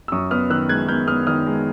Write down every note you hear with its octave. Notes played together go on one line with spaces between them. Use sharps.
E6
F#2 C#6 D#6
B3 D#6 F6
D#3 E6 F#6
G#3 F#6 G#6
B3 F6 G6
B3 D#6 F6
D#3 D#6 F6
G#3